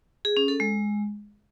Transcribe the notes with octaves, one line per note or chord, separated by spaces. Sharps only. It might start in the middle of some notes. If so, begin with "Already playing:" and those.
G#4
C#4
A4
G#3